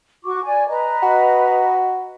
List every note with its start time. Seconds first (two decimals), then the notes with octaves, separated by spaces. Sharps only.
0.24 F#4 C#6 D6
0.44 D5 G#5
0.69 B4 D#5 A#5
1.03 F#4